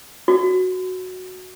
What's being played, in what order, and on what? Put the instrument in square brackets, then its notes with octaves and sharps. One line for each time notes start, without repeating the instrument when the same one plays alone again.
[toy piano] F#4